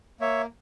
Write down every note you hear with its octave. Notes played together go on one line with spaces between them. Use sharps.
A#3 C#5 E5